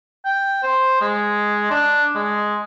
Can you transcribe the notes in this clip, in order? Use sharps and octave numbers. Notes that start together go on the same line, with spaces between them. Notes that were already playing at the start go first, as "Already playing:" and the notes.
G5
C5
G#3
D4
G#3